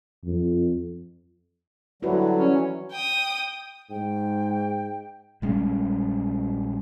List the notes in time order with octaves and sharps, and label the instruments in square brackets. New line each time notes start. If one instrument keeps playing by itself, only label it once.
[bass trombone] F2
[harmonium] D3 F#3 G3 [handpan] E4 F#4 B4
[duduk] C#4
[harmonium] E3 F#3
[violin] G5 D#6
[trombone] G#2 [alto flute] G5
[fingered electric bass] A#1 G3 G#3 C#4